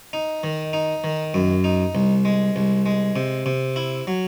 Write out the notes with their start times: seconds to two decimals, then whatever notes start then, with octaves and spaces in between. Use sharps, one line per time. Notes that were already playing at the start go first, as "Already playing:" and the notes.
0.13 D#4
0.44 D#3
0.73 D#4
1.04 D#3
1.34 F#2
1.64 D#4
1.95 C2
2.25 G#3
2.56 C2
2.86 G#3
3.16 C3
3.46 C3
3.76 E4
4.07 F#3